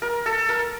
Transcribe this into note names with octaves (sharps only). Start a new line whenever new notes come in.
A#4
A4
A#4